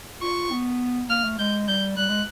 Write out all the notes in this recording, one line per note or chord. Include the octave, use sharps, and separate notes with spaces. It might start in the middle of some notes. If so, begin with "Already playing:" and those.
F4 C#6
B3
A#3 F6
A3
G#3 G6
G3 G6
G3 F#6
G#3